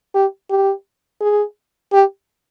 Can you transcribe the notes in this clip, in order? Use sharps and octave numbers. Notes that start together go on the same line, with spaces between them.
G4
G4
G#4
G4